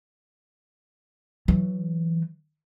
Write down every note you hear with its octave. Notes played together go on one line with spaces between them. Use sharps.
E3 F#3